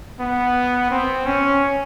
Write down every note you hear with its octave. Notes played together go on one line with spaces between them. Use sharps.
B3
C4
C#4